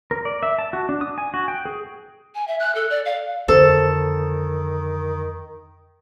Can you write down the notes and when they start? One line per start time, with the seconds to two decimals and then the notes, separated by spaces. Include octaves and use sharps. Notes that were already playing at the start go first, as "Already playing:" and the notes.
0.11 A#4
0.25 D5
0.43 E5
0.59 A5
0.73 F#4
0.89 D4
1.01 D#6
1.18 G#5
1.34 F#4
1.48 G5
1.65 G#4
2.35 G#5
2.48 E5
2.60 F#6
2.75 A4
2.90 D5
3.05 F5
3.48 F2 D3 D#3 A4 C5